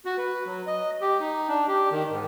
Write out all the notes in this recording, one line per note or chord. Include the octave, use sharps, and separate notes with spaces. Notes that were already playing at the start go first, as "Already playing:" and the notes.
F#4
B4
F#3
D#5
G4
D#4
D4
G4
D#3
G#2